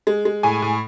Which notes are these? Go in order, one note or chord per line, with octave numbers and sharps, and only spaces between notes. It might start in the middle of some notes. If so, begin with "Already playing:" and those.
G#3
G#3
A2 G#5
A2